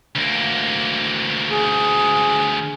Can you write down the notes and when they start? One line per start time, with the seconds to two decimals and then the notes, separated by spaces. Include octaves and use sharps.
0.15 D2 A#3
1.50 G#4